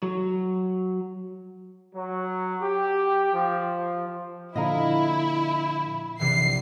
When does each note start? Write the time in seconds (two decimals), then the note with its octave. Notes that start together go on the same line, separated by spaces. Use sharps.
0.03 F#3
1.95 F#3
2.61 G4
3.33 F3
4.56 A#2 D3 F3 E4 D#5 F5 A#5
6.19 A#1 C3 E3 C7